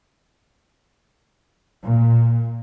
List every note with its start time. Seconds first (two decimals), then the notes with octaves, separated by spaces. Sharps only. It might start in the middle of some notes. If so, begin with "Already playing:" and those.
1.82 A#2